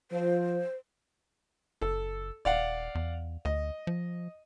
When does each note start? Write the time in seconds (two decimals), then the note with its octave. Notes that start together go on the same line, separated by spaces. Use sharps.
0.11 F3 C5
1.82 F#1 A4
2.45 D#1 D5 F5 F#5
2.95 E2
3.45 D2 D#5
3.87 F3